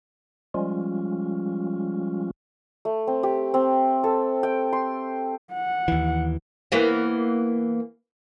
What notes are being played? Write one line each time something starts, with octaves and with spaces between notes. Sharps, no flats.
F3 G3 G#3 C#4 F4
A3
C4
G4
C4
A4
G5
C6
F#5
D#2 E3
E3 A#3 B3